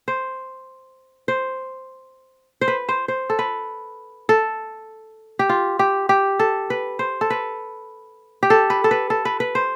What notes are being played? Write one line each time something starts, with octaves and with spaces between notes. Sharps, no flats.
C5
C5
C5
B4
C5
C5
A4
B4
A4
G4
F4
G4
G4
A4
B4
C5
A4
B4
G4
A4
B4
A4
B4
A4
B4
B4
C5